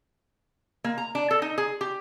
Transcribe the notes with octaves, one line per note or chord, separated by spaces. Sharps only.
A#3
A#5
D4
A4
D#4
G#4
G4